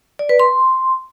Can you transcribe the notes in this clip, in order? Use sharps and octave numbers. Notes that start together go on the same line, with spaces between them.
D5
B4
C6